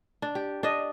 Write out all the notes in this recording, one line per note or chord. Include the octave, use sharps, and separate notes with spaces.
D4
G4
D4 D#5